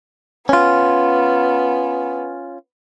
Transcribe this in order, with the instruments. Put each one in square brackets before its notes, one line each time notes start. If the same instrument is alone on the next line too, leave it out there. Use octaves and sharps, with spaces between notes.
[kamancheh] B3 [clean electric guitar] C#4 F4